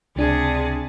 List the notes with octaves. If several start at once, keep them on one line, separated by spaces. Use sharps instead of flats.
C#2 C3 D4 G#4 A5